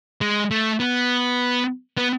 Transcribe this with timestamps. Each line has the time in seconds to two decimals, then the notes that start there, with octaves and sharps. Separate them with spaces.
0.21 G#3
0.51 A3
0.80 B3
1.97 B3